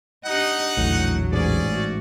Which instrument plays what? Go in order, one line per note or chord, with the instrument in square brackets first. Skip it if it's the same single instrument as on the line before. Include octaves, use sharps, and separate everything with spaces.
[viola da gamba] D4 G4 D#5 [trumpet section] D#4 F#5
[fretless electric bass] A#1 E2 D3 [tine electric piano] A2 [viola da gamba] F#3
[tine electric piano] A1 G#2 [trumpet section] C#4 G#4 D5
[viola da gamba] A3 F#4